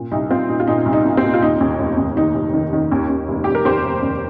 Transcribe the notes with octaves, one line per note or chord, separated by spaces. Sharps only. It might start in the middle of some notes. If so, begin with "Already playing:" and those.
Already playing: A#2
C2 D#4
C2 C4 F4
A#2 D#4
F4
A#2 D#4
C2
D#4
A#2
C4
A#2
F4
D#2 D#4
D#2
F1
D#2
D#3 D#4
F1
D#3
D#3
D#2
D#2
F1
F1 G4
A#4
D#2 G4 C5
F1
D#2